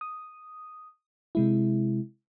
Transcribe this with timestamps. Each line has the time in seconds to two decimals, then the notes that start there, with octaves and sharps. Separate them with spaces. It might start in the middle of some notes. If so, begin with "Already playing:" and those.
0.01 D#6
1.35 C3 G#3 E4